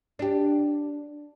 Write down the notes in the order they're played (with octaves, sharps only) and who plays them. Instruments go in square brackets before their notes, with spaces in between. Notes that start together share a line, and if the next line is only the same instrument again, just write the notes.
[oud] D4 G4